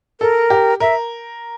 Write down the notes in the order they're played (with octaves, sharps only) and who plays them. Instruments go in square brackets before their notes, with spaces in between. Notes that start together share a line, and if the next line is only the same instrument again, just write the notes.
[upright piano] A4 [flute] A#4
[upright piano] G4
[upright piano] A#4 [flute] E5